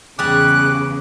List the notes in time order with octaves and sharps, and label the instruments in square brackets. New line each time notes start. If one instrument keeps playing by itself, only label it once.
[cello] E2 C#3 [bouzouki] G3 G#4 [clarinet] D6 [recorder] F#6